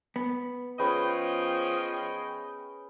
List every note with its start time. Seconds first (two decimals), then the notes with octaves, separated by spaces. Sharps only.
0.16 B3
0.79 F3 C#4 G#4 B4 C#5 D#5 G5